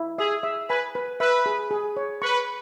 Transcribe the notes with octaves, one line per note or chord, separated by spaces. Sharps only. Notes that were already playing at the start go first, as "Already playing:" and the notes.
Already playing: E4
G#4 E5
E5
B4 G#5
B4
B4 E5
G#4
G#4
C#5
B4 C#6